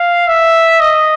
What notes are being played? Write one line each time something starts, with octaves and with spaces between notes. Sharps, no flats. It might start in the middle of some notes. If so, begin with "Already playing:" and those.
Already playing: F5
E5
D#5